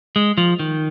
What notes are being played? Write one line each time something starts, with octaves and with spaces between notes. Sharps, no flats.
G#3
F3
D#3